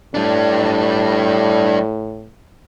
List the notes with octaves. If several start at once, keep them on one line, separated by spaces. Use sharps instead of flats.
A2 G3 D4